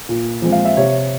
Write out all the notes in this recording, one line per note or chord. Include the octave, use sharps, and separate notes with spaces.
A#2
F3 G#3 C4
F5
E5
C3 C#5